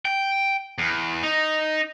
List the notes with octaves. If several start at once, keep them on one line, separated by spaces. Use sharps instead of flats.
G5
E2
D#4